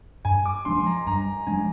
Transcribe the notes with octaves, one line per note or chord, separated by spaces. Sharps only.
G2 G#5
D6
F3 G#3 D4 C6
C6
A#5
G2 A#5
F3 G#3 D4 G#5